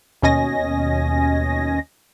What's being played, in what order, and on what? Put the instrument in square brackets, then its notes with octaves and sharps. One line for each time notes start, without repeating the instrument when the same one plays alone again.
[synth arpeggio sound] D#2 B2 C#4 D#5 G#5 A#6